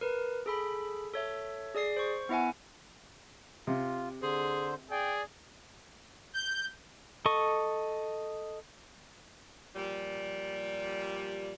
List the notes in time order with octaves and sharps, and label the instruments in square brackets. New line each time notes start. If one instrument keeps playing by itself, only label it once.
[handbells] A#4 B4
G#4 A4 B5
A4 C#5 E5
G#4 D5 D#6 C7
C5 C#6
B3 E4 E5 F#5 G#5
[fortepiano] C3 [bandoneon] F4
[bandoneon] D3 C5 [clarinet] G#4
[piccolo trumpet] G#4 [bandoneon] D5 [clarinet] G5
[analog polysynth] G6
[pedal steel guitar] A4 D#5 C#6
[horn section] A#2 F3 G3